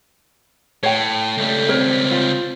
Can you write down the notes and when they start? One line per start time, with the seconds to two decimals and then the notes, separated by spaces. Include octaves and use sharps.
0.83 A2 C#5 G5
1.38 C#2 G3 A3
1.69 C4 A#4 C#5
2.11 F4